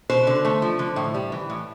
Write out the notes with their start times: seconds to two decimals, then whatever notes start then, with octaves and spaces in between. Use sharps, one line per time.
0.09 B2 C5
0.27 D3
0.45 A3
0.62 F3
0.79 D3
0.96 A2
1.14 G3
1.32 E3
1.50 A2